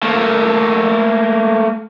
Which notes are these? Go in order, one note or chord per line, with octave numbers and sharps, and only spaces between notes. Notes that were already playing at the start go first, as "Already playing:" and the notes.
A3 A#3